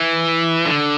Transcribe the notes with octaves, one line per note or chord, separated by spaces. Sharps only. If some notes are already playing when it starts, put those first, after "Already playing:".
Already playing: E3
D3